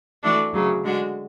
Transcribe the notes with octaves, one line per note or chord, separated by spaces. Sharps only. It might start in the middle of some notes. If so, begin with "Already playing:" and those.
E3 A3 D4 F#4 A4
D2 C#3 F#3
D3 G#3 D4 F#4